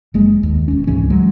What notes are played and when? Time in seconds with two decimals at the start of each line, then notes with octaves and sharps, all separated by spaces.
0.14 F#1 G#3 A#3
0.43 D#2
0.68 E1 C#4
0.87 C#2 G#2 E3 C#4
1.10 E3 F#3 G#3